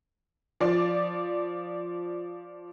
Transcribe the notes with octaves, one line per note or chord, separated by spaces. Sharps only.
F3 D5